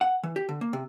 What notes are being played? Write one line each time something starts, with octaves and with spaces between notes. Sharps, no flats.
F#5
E3
G4
D3
A#3
C3